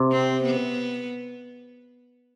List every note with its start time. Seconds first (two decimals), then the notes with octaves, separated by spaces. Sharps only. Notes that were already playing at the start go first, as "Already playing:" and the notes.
Already playing: C3
0.12 C4
0.43 B3